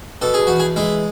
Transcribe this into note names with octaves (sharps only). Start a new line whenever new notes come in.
B2 A4
G#4
E2 F#4
G#4
G#3 E4